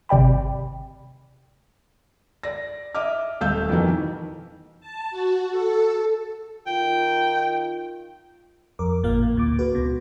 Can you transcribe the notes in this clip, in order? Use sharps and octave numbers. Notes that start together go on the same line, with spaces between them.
G#1 C3 D5 G5 B5
D5 A#6
D#5 E5 D6 F6
D#1 A3 F5 E6 G6
F2 B2 D#3 E3
A5
F#4
A4
D#3 F4 G5
F2 A#4 D6
G#1 A#2 A#3 F5
A2
D2 A#2 D6
F#4 B4
C#2 B2